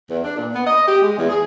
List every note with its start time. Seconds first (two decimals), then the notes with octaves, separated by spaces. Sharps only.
0.11 E2
0.24 D4
0.37 A#2
0.54 B3
0.67 D#5
0.88 G4
1.02 G#3
1.18 E2
1.30 G#4